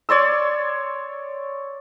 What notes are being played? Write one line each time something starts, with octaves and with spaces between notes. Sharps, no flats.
C#5 D5 C6 E6